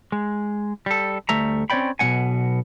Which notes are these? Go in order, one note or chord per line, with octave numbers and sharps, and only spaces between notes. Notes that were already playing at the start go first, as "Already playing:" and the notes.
G#3
G3 A4
D2 G3 A3 E5 A#5
C4 C#4 C#5 D5 G5 B5
B1 B2 F3 C4 F#5 G#5